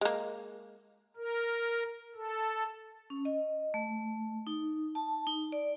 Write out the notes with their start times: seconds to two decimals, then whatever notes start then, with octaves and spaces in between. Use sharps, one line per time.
0.01 G#3 A#3
1.17 A#4
2.15 A4
3.10 C#4
3.25 D#5
3.74 A3
4.47 D#4
4.95 A5
5.27 D#4
5.52 D5